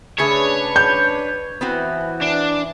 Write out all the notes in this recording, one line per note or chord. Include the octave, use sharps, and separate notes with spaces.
C#3 A3 D4 G#4 B4 C#5
G6
E3 B3 C4 F#4
D4